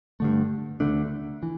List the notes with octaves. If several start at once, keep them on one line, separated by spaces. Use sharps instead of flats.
G2 D3 A3
D2 D3 A3 D4
E3